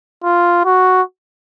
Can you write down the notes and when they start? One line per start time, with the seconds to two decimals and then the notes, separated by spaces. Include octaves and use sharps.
0.24 F4
0.65 F#4